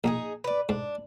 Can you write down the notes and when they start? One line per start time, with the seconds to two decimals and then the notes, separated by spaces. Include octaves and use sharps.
0.04 A#1 D#4 G4 G#4
0.44 B4 D5
0.69 G#2 D4